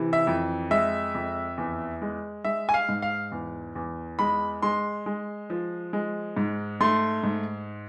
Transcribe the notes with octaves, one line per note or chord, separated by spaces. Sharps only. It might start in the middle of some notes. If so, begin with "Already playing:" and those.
Already playing: C3 E3
E5
F2
G#3 E5
F2
E2
G#3
G#3 E5
G#5
F5
G#2
F5
E2
E2
G#3 B5
G#3 C6
G#3
F3
G#3
G#2
A3 C6
G#2